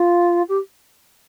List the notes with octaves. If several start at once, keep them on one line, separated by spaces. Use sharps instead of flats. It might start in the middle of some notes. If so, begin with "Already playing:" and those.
Already playing: F4
G4